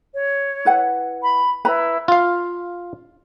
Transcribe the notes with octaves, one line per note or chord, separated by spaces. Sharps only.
C#5
E4 B4 F#5
B5
E4 B4 A#5 B5
F4 F5